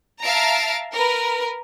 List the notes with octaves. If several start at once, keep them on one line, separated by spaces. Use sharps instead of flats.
E5 F5 A5 A#5 D7
A#4 B4